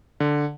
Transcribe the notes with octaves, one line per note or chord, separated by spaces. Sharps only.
D3